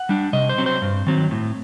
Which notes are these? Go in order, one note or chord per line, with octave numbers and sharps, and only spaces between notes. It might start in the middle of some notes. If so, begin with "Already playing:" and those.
Already playing: F#5
G3 D4
C3 D#5
C5
F#3 C4
C5
G2
D#3 F#3 C4
A2